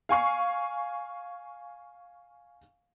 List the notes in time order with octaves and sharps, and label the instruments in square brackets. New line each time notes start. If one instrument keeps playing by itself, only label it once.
[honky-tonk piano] F5 G#5 C#6 C7